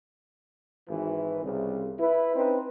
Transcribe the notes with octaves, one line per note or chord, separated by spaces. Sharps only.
G#1 E3
C2 C#3
E4 B4
C4 C#4 D#4 B4